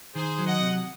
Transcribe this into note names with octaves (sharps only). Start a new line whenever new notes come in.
D#3 G#4 C5
F#3
D#5 F#5
C3